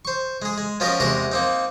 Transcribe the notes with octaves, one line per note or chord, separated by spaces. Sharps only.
C5 C#6
G#3 G#4
G#3
F3 B3 C#4 F#4 A#4 D#5
E2 C3 G#3 F#4 A#4 F#5
A#3 C4 D#4